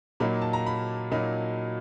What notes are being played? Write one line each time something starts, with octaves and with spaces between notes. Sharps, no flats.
A#2 F#3 A#3 D#4 B5
A5
A#5
B5
A#2 F#3 A#3 D#4 B5